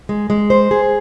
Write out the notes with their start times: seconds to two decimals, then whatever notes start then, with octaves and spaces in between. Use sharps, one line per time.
0.09 G#3
0.30 G#3
0.50 C5
0.71 G#4